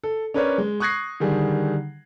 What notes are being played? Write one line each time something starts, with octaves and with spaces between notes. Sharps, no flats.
A4
C#4 D4 A#4 B4 C#5 D5
G#3
C#6 D#6 F#6 G#6 A#6 C7
D3 D#3 G3 G#4